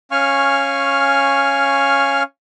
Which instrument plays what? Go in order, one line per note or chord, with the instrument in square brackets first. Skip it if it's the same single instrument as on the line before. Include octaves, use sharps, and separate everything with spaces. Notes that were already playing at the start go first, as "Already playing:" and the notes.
[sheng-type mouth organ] C#4 F5 G#5 C#6 F6